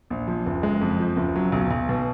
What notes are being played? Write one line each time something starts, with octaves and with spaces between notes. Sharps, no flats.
A#1
F3
F#1
G#3
F2
F3
F#1
F#3
B1
B1
B2